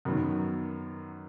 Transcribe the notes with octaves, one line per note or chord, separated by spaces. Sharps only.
F#2 D#3 F#3 B3